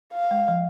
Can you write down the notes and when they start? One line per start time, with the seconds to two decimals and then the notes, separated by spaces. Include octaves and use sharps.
0.13 F5
0.31 G#3
0.48 F3